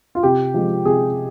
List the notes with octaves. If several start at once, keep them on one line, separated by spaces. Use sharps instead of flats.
F4
C3 G4
F3 G#3
C3 G#4